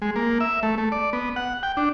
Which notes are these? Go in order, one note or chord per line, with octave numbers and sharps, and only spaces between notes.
G#3
A#3
E5
A3
A3
D5
B3
F#5
G5
D4